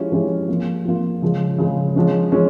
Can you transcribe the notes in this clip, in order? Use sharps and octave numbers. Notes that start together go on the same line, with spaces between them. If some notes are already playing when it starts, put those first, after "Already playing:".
Already playing: F3 G#3 C#4 E4 G4
F3 G#3 C#4 E4 G4
F3 A#3 F4
F3 A#3 F4
C#3 F3 G#3
C#3 F3 G#3
F3 G#3 C#4
F3 G#3 C#4